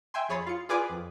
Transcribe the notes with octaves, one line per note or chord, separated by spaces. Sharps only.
E5 G5 G#5 C6
F2 G#4 C#5 B5 A6 C7
F4 C#7
F4 G#4 B4 D5 G#5 D6
F2